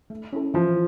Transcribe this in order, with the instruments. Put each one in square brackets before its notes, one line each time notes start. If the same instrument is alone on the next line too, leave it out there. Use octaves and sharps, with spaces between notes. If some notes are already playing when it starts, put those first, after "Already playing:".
[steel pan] A3
C#4 E4 A4
[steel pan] E3 [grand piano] F3